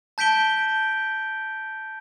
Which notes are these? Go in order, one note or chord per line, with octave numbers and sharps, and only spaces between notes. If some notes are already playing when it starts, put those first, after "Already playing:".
A5 G6 B6 D7 G7